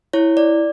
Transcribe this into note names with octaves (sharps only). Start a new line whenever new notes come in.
E4 C#5
D5